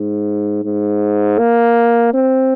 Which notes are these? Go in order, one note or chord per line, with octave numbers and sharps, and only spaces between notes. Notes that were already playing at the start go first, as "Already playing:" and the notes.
Already playing: G#2
G#2
A#3
C4